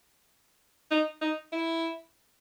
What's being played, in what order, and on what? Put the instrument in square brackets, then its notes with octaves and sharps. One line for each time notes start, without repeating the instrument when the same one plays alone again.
[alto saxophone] D#4
D#4
E4